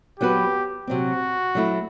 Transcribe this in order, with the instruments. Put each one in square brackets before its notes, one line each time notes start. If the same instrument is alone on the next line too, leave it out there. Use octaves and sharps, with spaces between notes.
[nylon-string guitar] F#3 B3 F#4 B4 [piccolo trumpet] G4
[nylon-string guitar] C3 F#3 C4 [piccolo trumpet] F#4
[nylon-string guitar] F#3 A3 E4